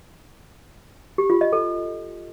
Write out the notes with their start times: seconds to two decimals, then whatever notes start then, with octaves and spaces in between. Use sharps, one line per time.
1.18 G4
1.30 F4
1.41 D#5
1.53 A4